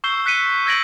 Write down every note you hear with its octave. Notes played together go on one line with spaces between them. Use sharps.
C#6 E6 G6 C7 G7
E6 F#6 B6 C#7 D#7 G7
E6 G6 G#6 A#6 D7 F#7